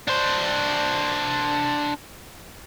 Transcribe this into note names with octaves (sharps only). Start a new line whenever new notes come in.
D4 C5